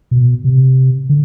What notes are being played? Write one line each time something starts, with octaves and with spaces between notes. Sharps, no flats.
B2
C3
D3